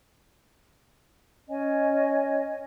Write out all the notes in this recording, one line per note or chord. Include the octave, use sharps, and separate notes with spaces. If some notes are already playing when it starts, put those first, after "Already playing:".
C#4 C#5 D#5 G#5